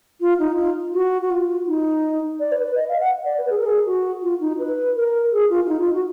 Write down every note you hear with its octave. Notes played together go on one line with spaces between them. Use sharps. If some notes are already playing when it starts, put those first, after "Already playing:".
F4
D#4
F4
F#4
F#4
F4
D#4
D5
B4
B4
D#5
F5
F#5
D5
B4
G#4
A#4
G#4
F#4
F4
D#4
B4
A#4
G#4
F4
F4
D#4
F4
F#4